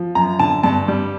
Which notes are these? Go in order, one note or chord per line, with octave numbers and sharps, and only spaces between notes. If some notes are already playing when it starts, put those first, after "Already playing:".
Already playing: F3
F#2 A#5
D3 A5
G2 A5
G3